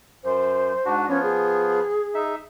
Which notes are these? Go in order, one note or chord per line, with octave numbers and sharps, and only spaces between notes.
F#2 C5
G#2 D4 F#4
F3 B3 C#4
G#4
D#4 E5